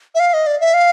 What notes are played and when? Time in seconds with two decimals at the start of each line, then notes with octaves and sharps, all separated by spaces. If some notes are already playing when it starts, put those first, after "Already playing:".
0.15 E5
0.20 F5
0.34 D#5
0.47 D5
0.60 E5
0.74 F5